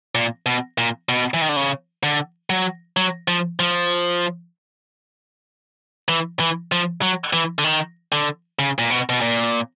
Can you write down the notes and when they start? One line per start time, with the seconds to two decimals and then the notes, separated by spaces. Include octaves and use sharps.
0.15 A#2
0.46 B2
0.78 A#2
1.09 B2
1.34 E3
1.41 D#3
1.49 D3
1.56 C#3
2.03 D3
2.50 F#3
2.97 F#3
3.28 F3
3.60 F3
6.09 E3
6.40 E3
6.72 F3
7.02 F#3
7.33 E3
7.59 D3
7.64 D#3
8.12 D3
8.59 C#3
8.79 A#2
8.90 B2
9.09 B2
9.21 A#2